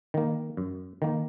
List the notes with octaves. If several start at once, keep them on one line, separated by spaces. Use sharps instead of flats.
D#3 A#3
F#2
D#3 A#3